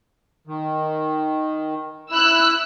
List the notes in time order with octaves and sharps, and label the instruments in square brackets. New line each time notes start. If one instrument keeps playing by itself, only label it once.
[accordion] D#3
[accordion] E4 [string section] E6 F#6